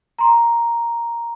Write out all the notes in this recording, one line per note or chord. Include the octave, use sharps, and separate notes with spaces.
A#5 C6